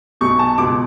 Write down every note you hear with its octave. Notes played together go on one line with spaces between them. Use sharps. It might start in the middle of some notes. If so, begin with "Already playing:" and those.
B1 B2 C#6
A5
C#2 B2 D6